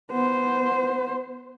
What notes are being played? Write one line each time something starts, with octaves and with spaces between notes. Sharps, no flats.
B3 C5